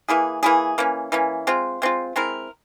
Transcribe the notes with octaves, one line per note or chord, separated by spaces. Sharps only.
E3 A#3 E4 G#4
E3 A#3 E4 G#4
E3 A#3 C#4
E3 A#3 C#4
G#3 C4 F4
G#3 C4 F4
G#3 C4 E4 A#4